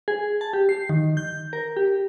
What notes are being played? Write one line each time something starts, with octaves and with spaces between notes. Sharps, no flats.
G#4
A5
G4
C7
D#3
G6
A#4
G4